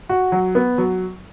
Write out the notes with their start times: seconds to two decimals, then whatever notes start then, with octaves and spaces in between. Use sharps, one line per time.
0.09 F#4
0.32 F#3
0.55 B3
0.78 F#3